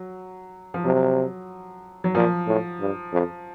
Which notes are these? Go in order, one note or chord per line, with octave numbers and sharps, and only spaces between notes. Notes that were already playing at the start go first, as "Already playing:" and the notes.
Already playing: F#3
F3
C3 F#3
F#3
A#2 F3
A2
G2
F2